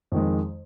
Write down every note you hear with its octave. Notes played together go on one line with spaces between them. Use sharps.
F2 D#3 G#3